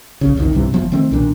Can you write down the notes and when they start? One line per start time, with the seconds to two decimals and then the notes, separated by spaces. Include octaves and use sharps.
0.21 A#1 C#3
0.36 F1 C2 C3 D#3
0.53 B1 G2 C3 E3
0.73 F#1 E3 F3 B3
0.92 D#3 F3 A3 C4
1.11 B1 A#2 D#3 D4